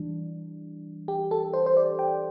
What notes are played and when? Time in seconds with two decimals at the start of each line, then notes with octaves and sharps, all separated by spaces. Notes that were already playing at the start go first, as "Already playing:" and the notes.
Already playing: E3 G3 D4
1.08 G4
1.31 A4
1.53 C5
1.66 C5
1.77 D5
1.99 G5